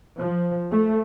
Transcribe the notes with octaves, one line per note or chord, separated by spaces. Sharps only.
F3
A3